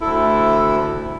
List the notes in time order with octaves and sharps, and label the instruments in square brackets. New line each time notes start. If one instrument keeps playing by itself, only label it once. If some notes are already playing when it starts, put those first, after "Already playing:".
[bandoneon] D2 A4 [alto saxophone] E4